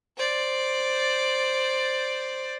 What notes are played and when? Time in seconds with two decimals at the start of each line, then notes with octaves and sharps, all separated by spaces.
0.17 C5 D5